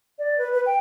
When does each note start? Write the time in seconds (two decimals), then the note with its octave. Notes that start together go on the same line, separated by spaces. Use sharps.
0.19 D5
0.38 B4
0.53 B4
0.66 G5